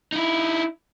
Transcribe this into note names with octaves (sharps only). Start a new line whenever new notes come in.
D#4 E4